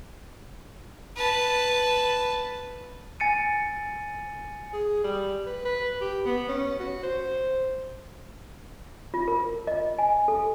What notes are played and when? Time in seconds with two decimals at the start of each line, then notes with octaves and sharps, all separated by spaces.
1.16 B4 A5
3.20 G#5 A6 C#7 D#7
4.73 G#4
5.04 G3
5.46 B4
5.65 B4
6.01 G4
6.25 B3
6.49 C#4
6.80 F#4
7.03 C5
9.14 F4
9.28 A#4
9.67 D#5
9.99 G#5
10.28 A4